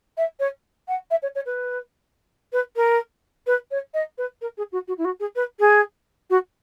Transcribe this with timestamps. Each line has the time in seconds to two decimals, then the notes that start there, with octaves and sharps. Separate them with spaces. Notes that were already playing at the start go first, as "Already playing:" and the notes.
0.17 E5
0.40 C#5
0.88 F#5
1.11 E5
1.22 C#5
1.35 C#5
1.46 B4
2.53 B4
2.76 A#4
3.47 B4
3.71 C#5
3.94 D#5
4.18 B4
4.41 A#4
4.57 G#4
4.72 F#4
4.88 F#4
4.98 E4
5.05 F#4
5.20 G#4
5.36 B4
5.59 G#4
6.30 F#4